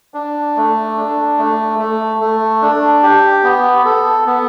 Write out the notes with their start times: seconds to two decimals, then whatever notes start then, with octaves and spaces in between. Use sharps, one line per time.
0.14 D4
0.56 A3
0.97 D4
1.38 A3
1.79 A3
2.20 A3
2.62 D4
3.03 G4
3.44 B3
3.85 A4
4.26 B3